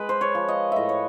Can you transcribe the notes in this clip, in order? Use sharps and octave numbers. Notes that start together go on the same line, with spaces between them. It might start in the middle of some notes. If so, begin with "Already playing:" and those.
Already playing: G#3 B4
C5
C#5
F3
D#5
A2 D#5 E5
C#5